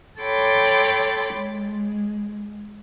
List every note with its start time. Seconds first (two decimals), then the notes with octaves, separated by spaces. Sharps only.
0.21 A4 C#5 G5 B5 C6 D6
1.36 G#3